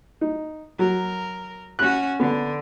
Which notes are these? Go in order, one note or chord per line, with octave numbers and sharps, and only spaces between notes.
D#4
F#3 A#4
C#4 F#4 F#6
D3 B3